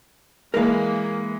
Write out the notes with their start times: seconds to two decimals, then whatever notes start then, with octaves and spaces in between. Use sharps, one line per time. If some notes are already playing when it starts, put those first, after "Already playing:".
0.54 E3 G#3 A#3 A#4 B4 F5